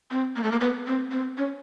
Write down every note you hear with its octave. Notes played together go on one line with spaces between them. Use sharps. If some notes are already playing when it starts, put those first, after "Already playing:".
C4
A#3
A3
A#3
B3
C4
C4
C#4